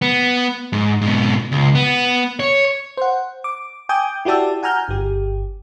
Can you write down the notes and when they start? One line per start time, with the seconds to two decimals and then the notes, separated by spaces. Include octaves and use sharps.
0.02 B3
0.73 G#2
1.01 G#2 B2
1.52 C#2
1.75 B3
2.40 C#5
2.97 C5 F#5
3.44 D6
3.89 G5 G#5 D6 D#6 G6
4.25 E4 F#4 G4 D5 A5 E6
4.63 F#5 G#5 A#5 F6 G6
4.88 G1 G4